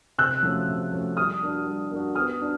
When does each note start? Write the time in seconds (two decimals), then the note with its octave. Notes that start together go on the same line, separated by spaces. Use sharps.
0.18 C3 E6 F#6
0.43 F3 A3 C#4 F#4
0.68 C3
0.92 F3 A3 C#4 F#4
1.17 G3 D#6 F6
1.42 A#3 D4 F#4
1.67 G3
1.91 A#3 D4 F#4
2.15 B3 D#6 F6
2.40 D4 F#4